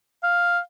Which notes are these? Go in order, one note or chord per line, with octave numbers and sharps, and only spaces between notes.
F5